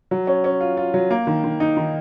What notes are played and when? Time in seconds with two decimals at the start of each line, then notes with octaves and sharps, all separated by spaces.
0.11 F#3
0.27 C#4
0.44 C#4
0.61 F4
0.77 F4
0.94 F#3
1.11 A#3
1.27 D#3
1.44 D#3
1.60 D#4
1.77 D#3